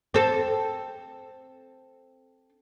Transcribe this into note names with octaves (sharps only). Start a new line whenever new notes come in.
C4 A4